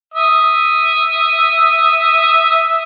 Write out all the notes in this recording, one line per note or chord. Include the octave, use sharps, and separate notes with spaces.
E5 D#6